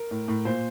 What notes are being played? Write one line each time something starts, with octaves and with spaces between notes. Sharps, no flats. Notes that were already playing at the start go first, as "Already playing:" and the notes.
Already playing: A#4
A2
A2
A#2 C5